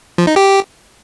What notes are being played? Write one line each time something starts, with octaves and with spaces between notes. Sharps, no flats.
F3
D#4
G4